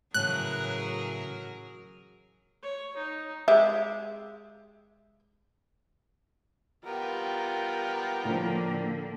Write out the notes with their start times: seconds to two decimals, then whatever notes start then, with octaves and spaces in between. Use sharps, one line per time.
0.14 A2 C#3 E3 F#3 G#4 A#4 F#6
2.63 C#5
2.97 D#4
3.48 G#3 G4 E5
6.85 G3 B3 F4 A#4 G5
8.25 A2 D3 F3 A#3